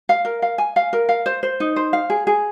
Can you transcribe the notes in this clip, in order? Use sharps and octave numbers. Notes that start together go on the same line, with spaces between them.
F5
A#4
F5
G#5
F5
A#4
F5
C5
C5
D#4
C5
F5
G#4
G#4